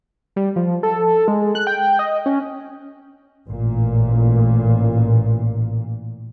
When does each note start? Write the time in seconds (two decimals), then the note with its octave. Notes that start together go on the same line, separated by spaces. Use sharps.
0.36 G3
0.56 F3
0.83 A4
1.28 G#3
1.55 F#6
1.67 G5
1.99 D#5
2.26 C#4
3.48 A1 A#2